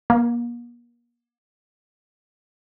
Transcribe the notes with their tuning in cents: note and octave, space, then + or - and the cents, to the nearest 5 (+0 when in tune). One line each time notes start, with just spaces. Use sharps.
A#3 +40